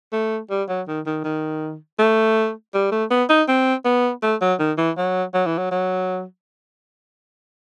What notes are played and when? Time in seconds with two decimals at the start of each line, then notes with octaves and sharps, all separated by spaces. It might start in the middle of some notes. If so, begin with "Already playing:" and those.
0.12 A3
0.50 G3
0.69 F#3
0.88 D#3
1.06 D#3
1.24 D#3
1.99 A3
2.74 G3
2.91 A3
3.10 B3
3.29 D#4
3.48 C4
3.85 B3
4.22 A3
4.41 F#3
4.59 D#3
4.78 E3
4.97 F#3
5.34 F#3
5.46 E3
5.58 F#3
5.71 F#3